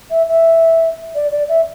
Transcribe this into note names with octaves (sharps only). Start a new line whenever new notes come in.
E5
E5
D5
D5
E5